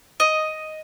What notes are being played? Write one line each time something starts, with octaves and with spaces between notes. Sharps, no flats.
D#5